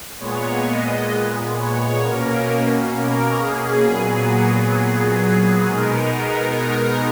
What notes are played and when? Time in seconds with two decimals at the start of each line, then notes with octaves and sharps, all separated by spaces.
0.19 A#2 G#3 B3 C#5
0.64 D#5
1.56 C#5
2.02 B2 A#3 C#4 A#4
2.92 A#4
3.38 G#4
3.84 A#2 F#3 B3
5.67 B2 G#3 B3 D#4 A#4
6.12 A#4
6.57 A#4